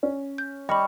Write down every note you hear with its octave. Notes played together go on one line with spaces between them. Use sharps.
C#4
G6
G3 D#5 B5 C#6